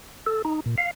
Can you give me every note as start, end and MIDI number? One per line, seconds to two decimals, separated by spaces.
0.26 0.42 69
0.45 0.60 63
0.66 0.75 46
0.78 0.91 77